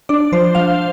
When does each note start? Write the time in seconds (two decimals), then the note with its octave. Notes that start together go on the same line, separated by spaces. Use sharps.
0.09 D4 D5
0.32 F3 C5
0.55 F3 F5